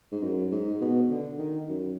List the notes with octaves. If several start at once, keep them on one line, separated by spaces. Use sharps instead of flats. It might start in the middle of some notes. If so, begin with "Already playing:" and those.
G#2
F#2
G#2
B2
D3
D#3
F#2